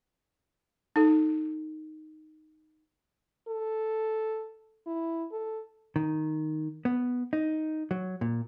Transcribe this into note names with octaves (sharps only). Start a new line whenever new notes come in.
D#4 A4
A4
E4
A4
D#3
B3
D#4
F#3
A#2